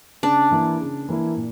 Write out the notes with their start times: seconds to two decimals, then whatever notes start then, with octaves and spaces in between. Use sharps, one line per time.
0.23 C#3 D4
0.51 E3 A#3 E4
0.81 C#3
1.09 E3 A#3 E4
1.36 A#2